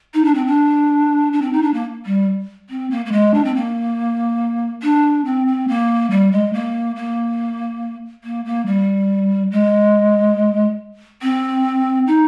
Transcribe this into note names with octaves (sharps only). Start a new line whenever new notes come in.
D#4
D4
C4
D4
D4
C4
D#4
D4
A#3
G3
C4
A#3
A#3
G#3
D4
C4
A#3
D4
C4
C4
A#3
G3
G#3
A#3
A#3
A#3
A#3
G3
G#3
C4
D#4